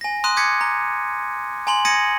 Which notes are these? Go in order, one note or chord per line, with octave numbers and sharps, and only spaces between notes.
G#5 A#6
A#5 C6 D#6 F#6 D#7
D6 D#6 G6 G#6 B6 C#7
A#5
G#5 A#5 C6 F#7
D#6 G#6 A#6 C#7 D#7